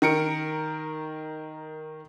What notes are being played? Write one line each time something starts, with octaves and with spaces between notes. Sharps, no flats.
D#3 A#4 C#7 D7